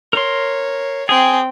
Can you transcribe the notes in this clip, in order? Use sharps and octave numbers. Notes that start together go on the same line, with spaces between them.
A#4 C#5 C6
C4 G#4 G5